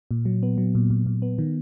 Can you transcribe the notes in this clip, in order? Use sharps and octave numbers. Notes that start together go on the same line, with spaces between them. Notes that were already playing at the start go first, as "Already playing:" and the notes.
A#2
F#3
B3
F#3
A#2
A#2
A#2
B3
D#3